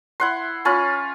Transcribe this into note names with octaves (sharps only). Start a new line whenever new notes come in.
E4 F#5 C6
C#4 F4 B5